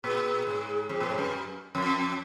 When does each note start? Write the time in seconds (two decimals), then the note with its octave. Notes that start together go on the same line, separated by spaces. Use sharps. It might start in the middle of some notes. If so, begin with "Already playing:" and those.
0.04 A#2 G#4
0.47 G#2
0.89 F2
1.00 A#2
1.09 G#2
1.18 F#2
1.75 F2 F#4